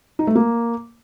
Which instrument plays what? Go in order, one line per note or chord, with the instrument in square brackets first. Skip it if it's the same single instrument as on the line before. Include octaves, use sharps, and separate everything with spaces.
[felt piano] D#4
A3
A#3